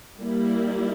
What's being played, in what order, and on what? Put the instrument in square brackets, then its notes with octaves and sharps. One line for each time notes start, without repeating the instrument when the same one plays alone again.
[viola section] G3 A#3 E4